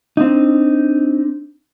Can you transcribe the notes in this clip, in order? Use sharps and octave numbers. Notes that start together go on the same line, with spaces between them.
C4 D4 D#4